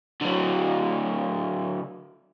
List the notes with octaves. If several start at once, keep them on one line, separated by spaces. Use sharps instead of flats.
D3 F#3